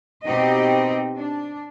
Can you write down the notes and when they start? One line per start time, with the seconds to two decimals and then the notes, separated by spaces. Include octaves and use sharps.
0.25 B2 C4 D#4 G4 D#5
1.17 D4